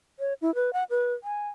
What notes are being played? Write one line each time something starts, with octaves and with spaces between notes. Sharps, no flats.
C#5
E4
B4
F#5
B4
G#5